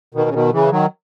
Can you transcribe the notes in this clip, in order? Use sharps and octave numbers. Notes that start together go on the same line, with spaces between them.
B2 D#3
C#3
B2 D#3
C#3 E3
D#3 F#3